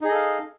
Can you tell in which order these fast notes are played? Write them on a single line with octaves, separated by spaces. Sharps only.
D#4 G#4 D#5 A4 F5